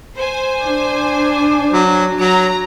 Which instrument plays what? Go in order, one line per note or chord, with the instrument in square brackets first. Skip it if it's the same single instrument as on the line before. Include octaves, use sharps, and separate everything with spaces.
[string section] C5 G#5
[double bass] D4
[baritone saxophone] F#3
[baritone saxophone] F#3 [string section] A#5